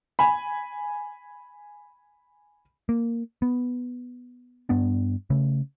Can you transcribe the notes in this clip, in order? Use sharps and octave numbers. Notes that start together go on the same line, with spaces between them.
G#5 B5
A#3
B3
G2 B3 D4
C#3 A3